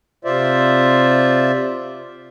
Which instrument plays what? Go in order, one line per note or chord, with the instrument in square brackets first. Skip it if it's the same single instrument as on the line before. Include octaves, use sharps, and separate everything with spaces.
[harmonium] C3 F4 C5 D5 E5